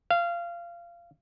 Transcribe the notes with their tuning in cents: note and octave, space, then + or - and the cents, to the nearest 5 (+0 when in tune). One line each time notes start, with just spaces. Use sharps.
F5 -20